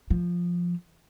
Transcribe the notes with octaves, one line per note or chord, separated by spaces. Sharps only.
F3